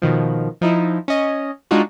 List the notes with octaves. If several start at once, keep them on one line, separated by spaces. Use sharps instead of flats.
B2 D#3 F3
F3 D#4 E4
C#4 D#5
G#3 D4 D#4 F4 F#4